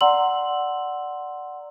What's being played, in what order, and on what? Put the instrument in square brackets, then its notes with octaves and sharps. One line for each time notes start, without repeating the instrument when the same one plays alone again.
[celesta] D5 F#5 A#5 C6 E6 F#7